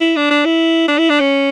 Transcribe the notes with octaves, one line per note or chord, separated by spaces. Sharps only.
E4
D4
D4
E4
D4
E4
D4
C#4